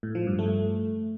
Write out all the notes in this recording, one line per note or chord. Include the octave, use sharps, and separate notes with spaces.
A2
F3
G2
A3